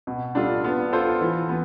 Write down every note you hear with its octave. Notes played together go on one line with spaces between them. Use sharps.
B2
G3 D4 F4 A4
B3
F4 A4 C5
E3
B3